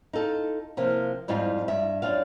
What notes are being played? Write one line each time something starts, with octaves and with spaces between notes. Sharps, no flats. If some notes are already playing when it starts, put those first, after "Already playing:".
D#4 F4 A4
C3 F3 A#3
F2 G#2 G3 D#4 F4
G2 E5
F#2 D4 F4 F5